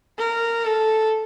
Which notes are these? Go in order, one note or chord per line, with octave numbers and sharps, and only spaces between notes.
A#4
A4